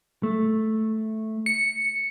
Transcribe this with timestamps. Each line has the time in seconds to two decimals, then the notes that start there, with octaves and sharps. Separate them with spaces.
0.23 A3
1.46 C#7